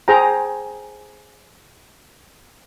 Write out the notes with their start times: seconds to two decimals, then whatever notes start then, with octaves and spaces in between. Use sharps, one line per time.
0.08 G#4 C5 G5 A#5